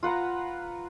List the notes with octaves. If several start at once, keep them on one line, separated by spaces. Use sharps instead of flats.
F4 B4 F#5 A#5